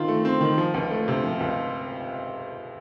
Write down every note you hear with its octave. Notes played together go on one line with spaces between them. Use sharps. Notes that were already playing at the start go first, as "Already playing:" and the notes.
Already playing: D#3 C4 F4
A3
C4
D#3
F3
C#2
A3
C3
F3
C#2